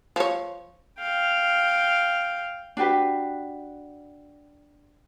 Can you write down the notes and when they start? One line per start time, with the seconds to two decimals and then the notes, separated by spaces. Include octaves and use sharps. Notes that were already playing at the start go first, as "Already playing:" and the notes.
0.16 F3 C#5
0.99 F5 G5
2.77 D4 F#4 G4 B4